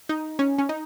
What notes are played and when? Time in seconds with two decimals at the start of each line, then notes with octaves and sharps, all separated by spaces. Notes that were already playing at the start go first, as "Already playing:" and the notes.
0.09 D#4
0.39 C#4
0.58 C#4
0.69 D#4